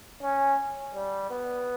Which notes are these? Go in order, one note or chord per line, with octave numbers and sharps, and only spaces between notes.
C#4
G3
B3